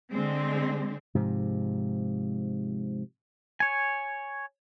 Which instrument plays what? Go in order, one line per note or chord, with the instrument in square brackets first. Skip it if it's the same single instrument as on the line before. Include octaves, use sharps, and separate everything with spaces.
[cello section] D3 G#3 C4
[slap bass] G#2 C3 F3
[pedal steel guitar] C#5 G#5